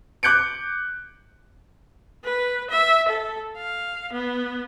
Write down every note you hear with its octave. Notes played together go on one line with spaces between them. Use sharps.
D6 F#6 G6 C#7 D7
B4
E5
A4
F5
B3